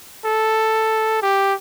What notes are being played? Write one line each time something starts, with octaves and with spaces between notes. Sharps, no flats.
A4
G4